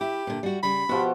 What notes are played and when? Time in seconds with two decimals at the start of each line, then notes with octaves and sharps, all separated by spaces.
0.01 E4 G4
0.27 A#2 D3
0.43 G3 F#4
0.63 C#3 G3 B5
0.89 B2 F3 F#4 G4